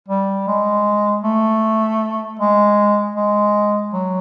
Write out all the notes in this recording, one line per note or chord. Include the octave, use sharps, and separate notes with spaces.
G3
G#3
A3
G#3
G#3
F#3